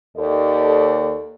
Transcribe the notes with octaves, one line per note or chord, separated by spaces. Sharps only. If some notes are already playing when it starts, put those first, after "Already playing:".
D#2 A4 D5